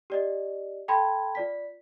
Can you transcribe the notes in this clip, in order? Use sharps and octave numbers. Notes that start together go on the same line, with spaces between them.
G4 D5 D#5
A4 G5 A5 B5 C6 G#6
F4 D5 B6